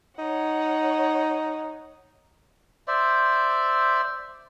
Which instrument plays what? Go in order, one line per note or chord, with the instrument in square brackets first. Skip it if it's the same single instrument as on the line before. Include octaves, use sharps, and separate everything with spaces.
[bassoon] D#4 [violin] C#5 F#5
[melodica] C5 D5 E5